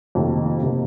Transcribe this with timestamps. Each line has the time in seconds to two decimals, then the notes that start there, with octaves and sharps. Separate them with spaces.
0.15 F2 C3 D#3 A#3
0.63 C3 D#3 A#3